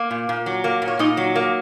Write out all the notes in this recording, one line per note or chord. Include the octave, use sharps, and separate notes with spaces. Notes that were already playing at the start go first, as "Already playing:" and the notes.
Already playing: A#3
A#2
A#2
F#3
A#3
A#2
C#5
A#2 D#4 D#5
F#3
A#3